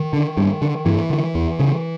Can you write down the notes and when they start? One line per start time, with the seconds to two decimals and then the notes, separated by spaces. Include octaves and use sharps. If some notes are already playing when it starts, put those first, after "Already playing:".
Already playing: D#3
0.13 D3
0.37 G2
0.62 D3
0.86 G2 E3
1.10 D3
1.35 E2
1.59 C#3